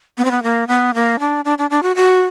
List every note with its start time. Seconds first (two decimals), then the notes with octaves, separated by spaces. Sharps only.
0.18 B3
0.25 C4
0.31 B3
0.43 A#3
0.68 B3
0.94 A#3
1.19 D4
1.45 D4
1.58 D4
1.70 D4
1.83 F#4
1.96 F#4